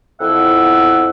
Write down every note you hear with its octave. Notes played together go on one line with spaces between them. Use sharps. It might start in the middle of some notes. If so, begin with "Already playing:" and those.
F2 E4 E5 F#5